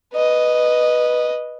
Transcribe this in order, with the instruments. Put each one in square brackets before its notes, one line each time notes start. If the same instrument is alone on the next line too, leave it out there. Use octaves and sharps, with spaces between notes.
[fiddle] B4 D#5